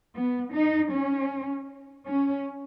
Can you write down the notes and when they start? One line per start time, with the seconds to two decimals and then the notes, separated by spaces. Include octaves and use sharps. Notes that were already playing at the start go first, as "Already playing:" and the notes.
0.16 B3
0.54 D#4
0.92 C#4
2.06 C#4